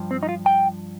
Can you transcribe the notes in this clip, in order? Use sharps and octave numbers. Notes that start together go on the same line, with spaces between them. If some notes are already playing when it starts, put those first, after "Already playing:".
Already playing: G2 F3
C4
D#4
F4
G5